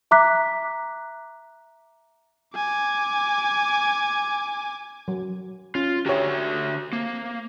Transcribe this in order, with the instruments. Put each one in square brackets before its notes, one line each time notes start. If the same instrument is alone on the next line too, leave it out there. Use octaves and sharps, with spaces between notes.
[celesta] E5 A#5 D6 F#6 B6
[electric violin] G#5 D6
[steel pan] F#3
[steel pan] C#4 [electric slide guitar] F4
[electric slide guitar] D3 F#4 E5 [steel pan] G4 C#5
[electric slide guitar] A#3 [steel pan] C4